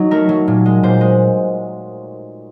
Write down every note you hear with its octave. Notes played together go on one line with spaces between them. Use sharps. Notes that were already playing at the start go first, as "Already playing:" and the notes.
Already playing: F#3 D#4
A3 A#4
F#3
A#2
G#3
A#2 C5
G#3